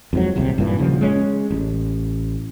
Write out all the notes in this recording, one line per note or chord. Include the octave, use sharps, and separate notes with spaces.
F2 G#2 F#3
D#1 C2 C3
G2 A#2 E3
D#1 C#3 F3 F#3
G#3 C#4
A1